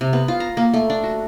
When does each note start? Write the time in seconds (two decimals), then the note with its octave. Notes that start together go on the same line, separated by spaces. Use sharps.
0.01 C3
0.13 B3
0.28 F4
0.40 A#5
0.57 A#3
0.74 A3
0.90 D4
1.03 F#4